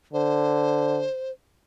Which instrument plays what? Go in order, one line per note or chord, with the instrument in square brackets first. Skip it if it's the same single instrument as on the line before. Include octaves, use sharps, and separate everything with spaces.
[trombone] D3 [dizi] C5